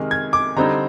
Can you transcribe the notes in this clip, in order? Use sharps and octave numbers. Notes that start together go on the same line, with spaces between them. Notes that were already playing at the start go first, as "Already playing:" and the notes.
Already playing: C3 D#3 G#3 F6
G#6
D6
D3 G3 C4 D#4 A#5